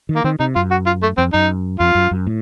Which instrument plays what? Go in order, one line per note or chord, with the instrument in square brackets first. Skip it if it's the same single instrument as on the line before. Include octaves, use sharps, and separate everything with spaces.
[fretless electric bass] D#3
[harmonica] A#3
[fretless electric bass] D#3 [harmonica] C4
[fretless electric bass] C3 [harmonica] D#4
[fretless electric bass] F#2 [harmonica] F4
[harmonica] F#4
F4
A3
[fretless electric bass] F2 [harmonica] C4
[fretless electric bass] F#2 [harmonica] D#4
[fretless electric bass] F2 [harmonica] F4
[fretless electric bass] F#2
F#2
A2